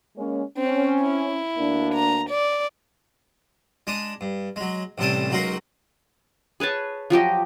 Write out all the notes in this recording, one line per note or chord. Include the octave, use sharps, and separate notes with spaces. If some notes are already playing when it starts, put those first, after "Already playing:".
G#3 A#3 C#4
C4 C#4
E4
D2 A#3 D4
A#5
D5
G#3 D4 D#6
G2
F#3 G#3
A1 A2 C3 G3 A5 D#6
C#2 F#3 D#4 F#4 A#4 C6
G#4 B4 C#5 A5
F3 F#3 G4 D#5